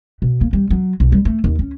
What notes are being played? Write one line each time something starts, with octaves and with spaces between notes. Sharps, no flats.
B2
A#3
G3
F#3
B1
G3
A3
D#2
C#4